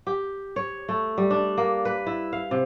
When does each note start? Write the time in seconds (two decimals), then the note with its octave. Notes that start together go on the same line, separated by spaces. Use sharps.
0.07 G4
0.56 C#5
0.89 A3
1.18 G3
1.30 D4
1.58 A#3
1.85 B4
2.07 E4
2.33 F5
2.51 C3